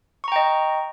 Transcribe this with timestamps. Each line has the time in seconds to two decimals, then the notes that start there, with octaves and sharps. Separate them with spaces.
0.24 C#6
0.28 A#5
0.32 G5
0.36 D#5